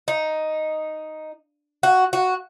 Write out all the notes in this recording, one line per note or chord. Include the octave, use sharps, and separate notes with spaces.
D#4
F#4
F#4